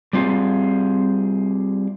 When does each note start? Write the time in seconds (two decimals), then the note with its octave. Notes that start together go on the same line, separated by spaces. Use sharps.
0.13 G3 C4 F4 G#4